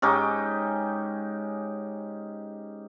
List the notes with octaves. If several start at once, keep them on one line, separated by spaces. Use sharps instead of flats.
G#2 C#4 D#4 G4